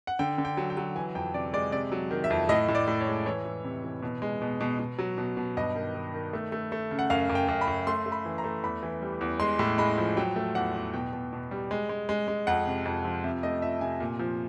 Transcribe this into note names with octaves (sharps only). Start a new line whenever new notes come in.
F#5
D3 G5
D3
G5
F#3
G5
F#3
E3 G#5
F2 G5
C3 D5
G#3 D5
C3 D5
F#3
D#3
E5
F2
A2 D#5
A2
D5
A2
C#5
G#3
E3 C#5
E3
C3
E3
B2
G#3
B2
B2
B2
F#3
B2
B2
G2 D#5
D#3
D#3
D#3
A3
A3
A3
C#3
F#5
F#2 F5
F#2
G5
F#2
B5
F#2
A3 C6
A3
B5
E3
A#5
A3
E2 B5
E3
G3
E2
G#3 C6
A2
G#3 B5
F3
F#3 G5
A3
E2 F#5
E2
B2 G5
B2
B2
G3
G#3
G#3
G#3
G#3
F2 F#5
C3
F2
F3
C3 E5
A3 D#5
F3 E5
C3 G#5
A#2
F3